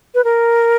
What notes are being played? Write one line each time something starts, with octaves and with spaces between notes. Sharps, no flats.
B4
A#4